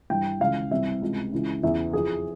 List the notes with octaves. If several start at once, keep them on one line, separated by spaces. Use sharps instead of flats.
G2 E3 G5
C#2 C#3 E3 F5
C2 C3 E3 E5
C#2 C3 E3
C#2 C#3 E3
E2 C#3 E3 E5
F2 E3 G#4